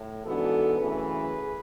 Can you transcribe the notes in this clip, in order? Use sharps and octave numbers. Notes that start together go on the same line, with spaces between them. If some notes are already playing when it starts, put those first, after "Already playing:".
Already playing: A2
G#2 E3 B3 D4 F#4 A4
F#2 C#3 E3 A3 G#4 B4